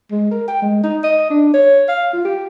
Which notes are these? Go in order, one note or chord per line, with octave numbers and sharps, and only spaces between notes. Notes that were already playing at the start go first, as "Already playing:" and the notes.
G#3
A#4
G5
G#3
D#4
D#5
D4
C#5
F5
F4
G4